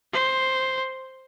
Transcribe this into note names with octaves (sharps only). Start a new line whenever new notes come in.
C5